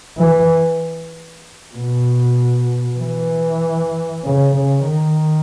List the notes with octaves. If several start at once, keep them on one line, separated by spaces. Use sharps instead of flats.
E3
B2
E3
C#3
C#3
D#3